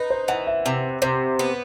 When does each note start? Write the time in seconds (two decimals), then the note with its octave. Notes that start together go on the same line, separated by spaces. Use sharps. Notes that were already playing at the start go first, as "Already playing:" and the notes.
Already playing: D#4 B4
0.10 C5
0.28 E3 F#5
0.47 E5
0.66 C3
1.02 C3 C5
1.39 B3